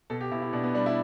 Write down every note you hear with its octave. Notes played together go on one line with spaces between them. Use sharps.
B2 A4
G4
B2 E4
E4
B2 D4
B3
G3 D4
E4